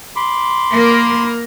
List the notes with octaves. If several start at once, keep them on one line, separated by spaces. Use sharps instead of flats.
B5 C6 D6
A#3 A#4